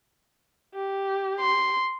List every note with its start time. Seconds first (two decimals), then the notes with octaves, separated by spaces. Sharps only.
0.75 G4
1.40 C6